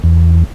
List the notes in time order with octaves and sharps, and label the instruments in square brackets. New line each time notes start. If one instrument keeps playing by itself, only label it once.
[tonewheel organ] E2